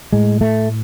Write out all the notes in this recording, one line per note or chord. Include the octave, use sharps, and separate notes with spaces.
A2 G#3
A3